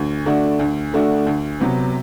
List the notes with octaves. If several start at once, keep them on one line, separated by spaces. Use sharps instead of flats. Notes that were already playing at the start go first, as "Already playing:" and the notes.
Already playing: D2
D3 A3 D4 F#4
D2
D3 A3 D4 F#4
D2
C3 F#3 B3